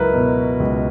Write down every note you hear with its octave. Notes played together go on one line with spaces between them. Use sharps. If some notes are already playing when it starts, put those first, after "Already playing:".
Already playing: C#2 F#3 E4 F#4 A#4 B4
B2
C#2